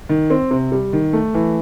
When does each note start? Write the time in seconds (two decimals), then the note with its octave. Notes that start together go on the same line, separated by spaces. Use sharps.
0.09 D#3
0.30 C4
0.51 C3
0.72 G3
0.93 D#3
1.13 A3
1.34 E3